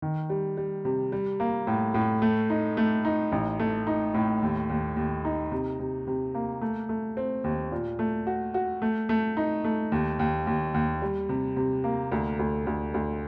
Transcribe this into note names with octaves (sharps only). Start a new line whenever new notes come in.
D#3
G3
G3
C3
G3
A#3
A2
A2
A3
D#4
A3
D#4
A1
A3
D#4
A2
D#2
D#2
D#2
D#4
C3
C3
C3
A#3
A3
A3
C4
D#2
A#2
A3
F#4
F#4
A3
A3
D#4
A3
D#2
D#2
D#2
D#2
G3
C3
C3
A#3
D2
D2
D2
D2